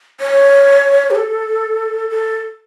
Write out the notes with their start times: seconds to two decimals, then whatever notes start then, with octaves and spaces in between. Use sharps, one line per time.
0.20 C#5
1.11 G4
1.15 A4
2.10 A4